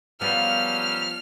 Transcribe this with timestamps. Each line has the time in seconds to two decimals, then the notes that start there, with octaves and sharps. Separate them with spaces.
0.21 F#2 C#3 F3 G3 B3 F6